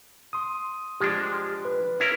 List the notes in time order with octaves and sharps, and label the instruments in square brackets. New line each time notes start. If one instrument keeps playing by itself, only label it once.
[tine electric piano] C6 D#6
[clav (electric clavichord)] F3 G#3 D4 [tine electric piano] G4
[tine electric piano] B4
[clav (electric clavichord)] C#4 E4 A#4